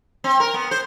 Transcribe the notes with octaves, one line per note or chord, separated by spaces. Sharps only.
C4
A#4
B3
C5